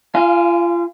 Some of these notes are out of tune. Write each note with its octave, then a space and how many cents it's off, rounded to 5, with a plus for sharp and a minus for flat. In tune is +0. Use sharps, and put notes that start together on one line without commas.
F4 -30 F5 +0 G#5 +0